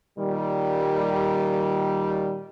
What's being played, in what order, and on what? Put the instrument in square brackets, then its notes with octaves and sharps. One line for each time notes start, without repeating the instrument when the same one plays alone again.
[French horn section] A#2 D#3 G3